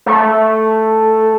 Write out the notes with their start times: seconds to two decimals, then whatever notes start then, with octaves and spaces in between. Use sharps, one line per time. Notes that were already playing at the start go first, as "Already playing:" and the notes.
0.06 A3